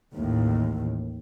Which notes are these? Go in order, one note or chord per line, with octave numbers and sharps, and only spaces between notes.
A1 D#2 A2